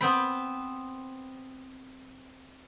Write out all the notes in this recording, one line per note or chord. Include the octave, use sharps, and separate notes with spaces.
B3 C4 G5 B5